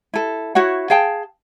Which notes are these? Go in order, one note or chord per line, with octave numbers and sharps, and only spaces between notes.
E4 A4
E4 F#4 C#5 F#5
G#4 F5 G5 A5